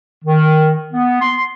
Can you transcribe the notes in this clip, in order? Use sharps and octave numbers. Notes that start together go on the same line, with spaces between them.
D#3
B3
C6